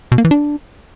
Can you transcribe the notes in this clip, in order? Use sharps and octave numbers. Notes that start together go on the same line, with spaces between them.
B2
A#3
E3
D4